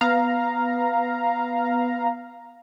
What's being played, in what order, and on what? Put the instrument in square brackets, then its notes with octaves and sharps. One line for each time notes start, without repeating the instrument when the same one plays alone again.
[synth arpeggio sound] B3 F5 A#5